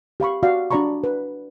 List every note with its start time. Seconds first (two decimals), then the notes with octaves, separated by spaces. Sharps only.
0.20 G4 F5 B5 C#6
0.43 F#4 D5 F5
0.71 D4 F#4 D5 A#5 B5 C#6
1.04 B4